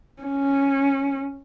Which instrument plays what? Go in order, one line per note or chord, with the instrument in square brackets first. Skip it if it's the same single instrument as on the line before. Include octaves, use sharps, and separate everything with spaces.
[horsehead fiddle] C#4